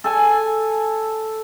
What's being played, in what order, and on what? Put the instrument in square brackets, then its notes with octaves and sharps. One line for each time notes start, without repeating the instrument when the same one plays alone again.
[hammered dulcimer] A4 G#5